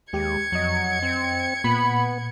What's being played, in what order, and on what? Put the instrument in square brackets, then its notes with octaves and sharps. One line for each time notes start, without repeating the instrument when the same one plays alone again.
[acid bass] D#2 [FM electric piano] G#3 G4 [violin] G#6 C#7
[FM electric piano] F2 D#5 [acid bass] F#3
[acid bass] C4
[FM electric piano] A#2 [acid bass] B3 [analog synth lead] B5